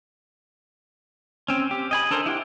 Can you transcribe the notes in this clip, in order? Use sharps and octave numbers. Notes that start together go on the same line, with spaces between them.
C4 C#4
G4
D#5 G#5 B5
D4 A4 A#4 C5
E4 G4 F#5 G5